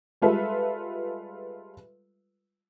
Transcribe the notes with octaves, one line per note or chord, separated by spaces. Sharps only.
G3 G#3 F4 A4 B4 E5